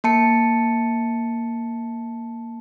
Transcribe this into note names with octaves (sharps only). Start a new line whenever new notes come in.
A#3 A5 C#7